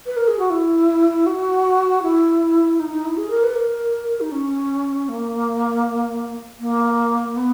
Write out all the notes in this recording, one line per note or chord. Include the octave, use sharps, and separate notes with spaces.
B4
A#4
G#4
F#4
E4
F#4
E4
D#4
D#4
E4
G#4
A#4
B4
A#4
D#4
C#4
A#3
A#3
B3